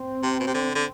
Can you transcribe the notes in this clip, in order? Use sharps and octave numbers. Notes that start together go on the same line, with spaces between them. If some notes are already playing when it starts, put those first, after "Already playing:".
Already playing: C4
C3
B2
C3
D3
D3